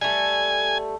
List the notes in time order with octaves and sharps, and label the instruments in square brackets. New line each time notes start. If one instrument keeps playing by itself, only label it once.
[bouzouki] G3 A3 [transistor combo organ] G#5